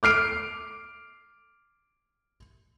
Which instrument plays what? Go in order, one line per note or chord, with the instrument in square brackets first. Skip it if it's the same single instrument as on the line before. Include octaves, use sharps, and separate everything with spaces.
[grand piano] D6 F6 C7 D7